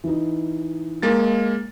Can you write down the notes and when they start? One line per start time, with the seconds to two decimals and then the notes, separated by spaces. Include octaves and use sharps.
0.04 E3 D#4
1.02 G#3 A#3 A6